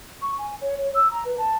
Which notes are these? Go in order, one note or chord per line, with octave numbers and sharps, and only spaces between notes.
C#6
G#5
C#5
C#5
E6
A#5
B4
A5